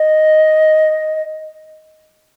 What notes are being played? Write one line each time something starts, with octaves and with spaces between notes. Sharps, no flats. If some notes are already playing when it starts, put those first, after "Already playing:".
Already playing: D#5